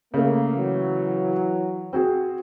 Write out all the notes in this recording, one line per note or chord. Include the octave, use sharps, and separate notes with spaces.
C#3 A3 A#3
E3 F#3
C4 F#4 G#4